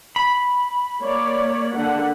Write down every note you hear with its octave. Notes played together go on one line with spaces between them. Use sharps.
B5
A#3 C#5 D5
D3 A#3 F#5